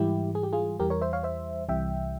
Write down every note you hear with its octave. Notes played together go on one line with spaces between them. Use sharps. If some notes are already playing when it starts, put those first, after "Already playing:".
Already playing: G#2 E3 G3 E4 G4
G#4
G4
F4 G#4
E2 E3 G3 G4 A#4
A#4 C#5
C5 E5
C#5 F5
C5 E5
C2 C3 E3 G3 E5 G5